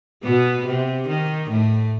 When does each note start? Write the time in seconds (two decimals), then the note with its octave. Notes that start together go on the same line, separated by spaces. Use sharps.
0.23 B2 B3
0.66 C3
1.08 D#3
1.50 A2 A3